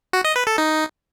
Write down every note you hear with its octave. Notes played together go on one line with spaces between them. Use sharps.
F#4
D#5
B4
A4
D#4